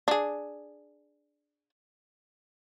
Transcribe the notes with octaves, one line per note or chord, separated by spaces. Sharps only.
D4 G#4